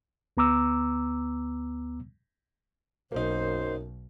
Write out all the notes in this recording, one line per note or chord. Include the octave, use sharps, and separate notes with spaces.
D2 B3 A#5 D6 E6
B1 F#2 A#3 D#4 C5